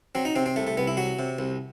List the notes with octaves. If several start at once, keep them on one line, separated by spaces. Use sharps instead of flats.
F#3 C4
D#4
C3 C4
C4
C2 A3
A3
C2 B3
E4
F#3 F#4
C3
C2